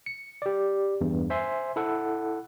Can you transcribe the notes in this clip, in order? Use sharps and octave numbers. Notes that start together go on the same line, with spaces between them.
C#7
G4 D5
E2 G2
C5 E5 G#5 C6
E4 A4 F#5